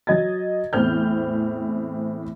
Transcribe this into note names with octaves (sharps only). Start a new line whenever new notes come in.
F#3 D#5 G#6 A6
E2 A2 C4 F6 G6